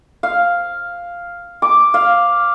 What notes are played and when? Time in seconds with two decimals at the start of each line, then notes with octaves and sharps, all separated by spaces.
0.23 F5
1.62 D6
1.94 F5